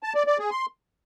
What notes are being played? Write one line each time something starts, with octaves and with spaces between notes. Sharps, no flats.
A5
D5
D5
G#4
C6